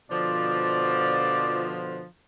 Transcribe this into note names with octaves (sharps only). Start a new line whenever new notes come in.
B2 D3 F3 D5